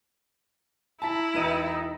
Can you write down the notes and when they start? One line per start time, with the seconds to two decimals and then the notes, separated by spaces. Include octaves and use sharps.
1.02 E4 A5 A#5 B6
1.34 E1 D#4 B4 D#7